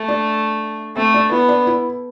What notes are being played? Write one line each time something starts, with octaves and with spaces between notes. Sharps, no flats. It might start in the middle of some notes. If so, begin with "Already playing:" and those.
Already playing: A3
D4
A3 C4
D4
B3 E4
D4
E4